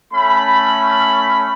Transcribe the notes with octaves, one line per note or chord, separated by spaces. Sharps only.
A3 C#4 B5